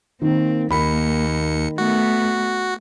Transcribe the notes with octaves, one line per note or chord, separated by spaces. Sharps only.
D#3 A#3 C4
D#2 D#3 A#3 B5 C#7
A3 B3 F#4